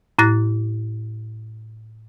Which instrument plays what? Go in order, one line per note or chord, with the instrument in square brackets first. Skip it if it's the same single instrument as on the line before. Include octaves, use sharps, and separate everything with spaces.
[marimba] A2 E4 F#6 A6 A#6